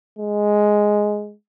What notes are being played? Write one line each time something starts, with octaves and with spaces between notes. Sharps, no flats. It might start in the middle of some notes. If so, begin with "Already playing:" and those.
G#3